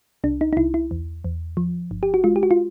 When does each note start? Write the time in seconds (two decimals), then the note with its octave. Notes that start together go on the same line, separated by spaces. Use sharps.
0.24 C2 D4
0.41 D#4
0.53 D#4
0.57 C2 E4
0.74 E4
0.91 E2
1.24 E2
1.57 F3
1.91 G1
2.03 G4
2.14 F#4
2.24 G#3 F4
2.36 G4
2.43 F#4
2.51 F4